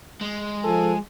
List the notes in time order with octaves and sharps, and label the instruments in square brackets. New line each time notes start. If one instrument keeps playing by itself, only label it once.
[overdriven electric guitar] G#3
[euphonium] F3 [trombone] A4 [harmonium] G#5